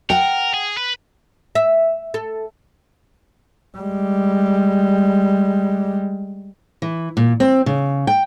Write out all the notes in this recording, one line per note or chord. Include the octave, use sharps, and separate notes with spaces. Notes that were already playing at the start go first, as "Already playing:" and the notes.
A#4 F#5 G5
G#4
B4
E5
A4
G3 G#3
E3
A#2
C4
C#3
G5